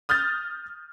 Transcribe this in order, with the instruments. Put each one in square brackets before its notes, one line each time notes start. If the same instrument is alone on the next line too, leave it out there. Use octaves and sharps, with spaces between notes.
[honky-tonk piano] D#6 F6 G6 A6